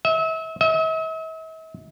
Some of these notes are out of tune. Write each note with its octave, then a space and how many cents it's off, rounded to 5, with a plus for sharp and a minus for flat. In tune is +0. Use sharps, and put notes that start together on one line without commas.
E5 -35
E5 -45